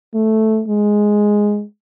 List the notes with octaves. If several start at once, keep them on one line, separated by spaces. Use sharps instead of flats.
A3
G#3